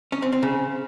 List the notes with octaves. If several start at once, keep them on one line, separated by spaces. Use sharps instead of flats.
C#4
C4
C4
C#3